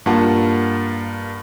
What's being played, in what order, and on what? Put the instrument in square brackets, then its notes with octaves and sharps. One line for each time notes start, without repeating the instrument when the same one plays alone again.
[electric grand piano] G2 A#3 F4 F#5 A5